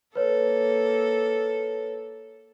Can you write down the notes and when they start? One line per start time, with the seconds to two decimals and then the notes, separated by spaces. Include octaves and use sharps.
0.15 A#3 A4 B4 C#5